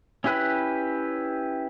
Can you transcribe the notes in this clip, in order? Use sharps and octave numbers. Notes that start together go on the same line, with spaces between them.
C#4 E4 G4 B4 F#6